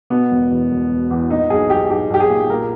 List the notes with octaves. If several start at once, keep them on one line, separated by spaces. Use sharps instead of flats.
B2 B3
E1
E2
E1
E1
E2
A#2 D#4
B1 G#4
B1 G4
B1 G4
B1 G4
G#4
A#2
A#2 A#4